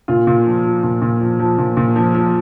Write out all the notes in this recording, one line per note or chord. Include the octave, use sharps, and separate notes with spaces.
A#2 F4
A#2
F3
F3
A#2
A#2
F3
F3
A#2
A#2
F3
F3